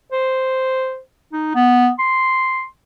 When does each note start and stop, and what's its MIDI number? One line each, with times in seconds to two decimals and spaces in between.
0.12 0.99 72
1.33 1.54 63
1.55 1.89 59
1.99 2.66 84